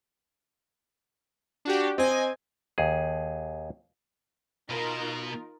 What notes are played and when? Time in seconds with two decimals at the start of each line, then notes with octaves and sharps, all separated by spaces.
1.65 D4 F#4 G4
1.98 C4 D#5 G#5
2.78 D#2 G#4
4.70 B2 D#4 F4 A#4